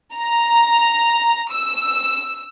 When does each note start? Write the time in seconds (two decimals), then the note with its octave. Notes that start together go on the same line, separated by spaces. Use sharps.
0.13 A#5
1.50 E6